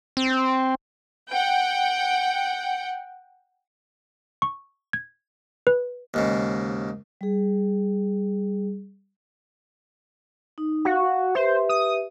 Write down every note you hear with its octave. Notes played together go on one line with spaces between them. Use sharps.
C4
F#5 G5
C#6
G#6
B4
D#2 G#2 C#3
G3 G#4
D#4
F#4 F5
G4 B4 C5 E5
D#6